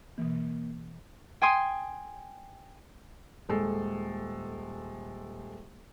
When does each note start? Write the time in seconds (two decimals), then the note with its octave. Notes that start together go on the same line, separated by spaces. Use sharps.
0.18 B2 E3 A#3
1.42 G5 G#5 C6 D#6
3.49 D#1 G#3 A4